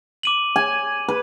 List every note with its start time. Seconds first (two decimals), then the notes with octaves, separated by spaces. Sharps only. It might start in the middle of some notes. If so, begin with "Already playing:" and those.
0.23 D6 D#7 F#7
0.56 G#5
1.09 B4